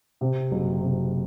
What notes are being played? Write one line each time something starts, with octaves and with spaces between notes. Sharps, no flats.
C3
F#1
C3